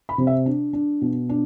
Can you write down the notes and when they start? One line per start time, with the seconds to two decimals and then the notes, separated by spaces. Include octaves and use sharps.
0.09 B5
0.18 C3
0.27 E5
0.46 D4
0.73 D4
1.01 B2
1.29 D4